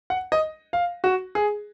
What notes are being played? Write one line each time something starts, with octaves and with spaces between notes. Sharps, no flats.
F#5
D#5
F5
F#4
G#4